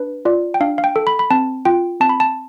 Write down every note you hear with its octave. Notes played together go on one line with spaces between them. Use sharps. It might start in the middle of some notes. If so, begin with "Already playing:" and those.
Already playing: D4 B4
F4 D5
G5
D4 F5
F5
G5
A4
B5
B5
C4 A5
F4 G5
C4 A5
B5
A5